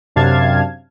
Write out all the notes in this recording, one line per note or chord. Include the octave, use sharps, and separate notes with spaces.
F#2 C3 D4 F5 A5 G#6